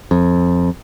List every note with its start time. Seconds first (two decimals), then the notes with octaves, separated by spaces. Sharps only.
0.11 F2